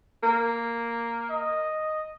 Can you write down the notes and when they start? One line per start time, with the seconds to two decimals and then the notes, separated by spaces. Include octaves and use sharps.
0.23 A#3
1.30 D#5